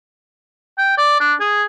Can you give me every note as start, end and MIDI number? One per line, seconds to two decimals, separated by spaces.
0.78 0.95 79
0.98 1.17 74
1.20 1.34 62
1.40 1.63 68